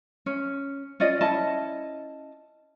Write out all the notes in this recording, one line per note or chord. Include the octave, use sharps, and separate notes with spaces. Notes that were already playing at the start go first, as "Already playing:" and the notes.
C#4
C#4 F4 D5 D#5
C#4 E4 D#5 A5